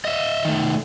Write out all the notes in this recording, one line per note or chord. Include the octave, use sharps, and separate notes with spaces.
D#5 E5
D#3 A3